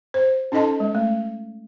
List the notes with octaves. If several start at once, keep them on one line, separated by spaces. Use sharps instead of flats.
C5
C#4 D#4 A4 D#5 A5 C6
G#3
A3